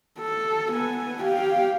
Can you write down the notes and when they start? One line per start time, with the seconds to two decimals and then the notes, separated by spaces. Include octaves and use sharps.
0.19 A4
0.72 B3 G#5
1.22 G4 F5